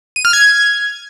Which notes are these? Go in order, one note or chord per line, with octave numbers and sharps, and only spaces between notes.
D#7
F6
G#6